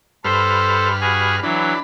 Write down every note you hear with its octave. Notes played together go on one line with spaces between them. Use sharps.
G2 A4 B4 C5 F6
F#4 G#4
E3 F#3 D4 B5